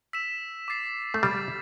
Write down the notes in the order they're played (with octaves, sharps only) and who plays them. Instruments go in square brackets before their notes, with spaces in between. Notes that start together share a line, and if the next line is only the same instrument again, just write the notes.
[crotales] E6 B6 E7
D6 A6 C7
[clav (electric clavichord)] A3
[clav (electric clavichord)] G3 [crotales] D6 A6 C7